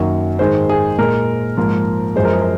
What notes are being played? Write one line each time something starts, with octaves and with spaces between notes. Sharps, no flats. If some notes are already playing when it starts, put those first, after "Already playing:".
Already playing: F#2 D#3 F#3 A#3
G#2 D#3 G#3 C5
G#4
A#2 G#3 A#4
G#2 F3 A#3
F#2 F3 G#3 C5
A#4
G#4
A#4